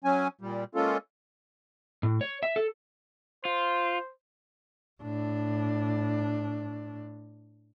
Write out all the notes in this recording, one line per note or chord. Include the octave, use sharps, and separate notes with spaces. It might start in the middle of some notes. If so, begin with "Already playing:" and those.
F#3 C#4 G#5
A#2 G3
G#3 A#3 C#4 F4 A4
A2
C#5
E5
A4
F4 C5
A2 D4